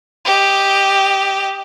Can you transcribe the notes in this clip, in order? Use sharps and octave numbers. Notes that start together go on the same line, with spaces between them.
G4 D#5